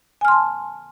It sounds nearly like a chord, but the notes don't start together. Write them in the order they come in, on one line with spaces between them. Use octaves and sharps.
G#5 F6 C6 A5